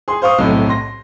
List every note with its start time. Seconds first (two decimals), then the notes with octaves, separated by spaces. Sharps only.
0.08 G#4 C6
0.22 C5 F5 C#6 D#6
0.38 D#1 B1 A2 C3
0.69 C6 A#6